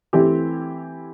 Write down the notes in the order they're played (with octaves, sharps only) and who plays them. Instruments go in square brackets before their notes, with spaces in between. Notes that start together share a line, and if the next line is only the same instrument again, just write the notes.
[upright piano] E3 A3 C4 E4 G4